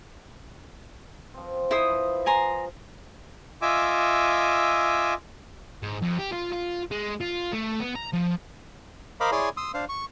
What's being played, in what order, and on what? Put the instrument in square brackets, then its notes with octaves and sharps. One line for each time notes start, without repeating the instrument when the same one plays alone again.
[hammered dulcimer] F3 C4
[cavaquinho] E4 C5 D#6 [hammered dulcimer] D#5
[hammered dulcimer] F3 B4
[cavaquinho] G#5 A#5 C6
[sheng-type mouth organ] F4 D#5 E5 G#5 D6 E6
[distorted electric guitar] G#2
F2
G4
F4
F4
G#3
F4
A3
B3
A#5
F3
[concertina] A#4 C5 D#5 F5 B5 D6
E4 G#4 C#5 D5 G#5 C6
C6 D#6 E6
D4 C5 F5
C#6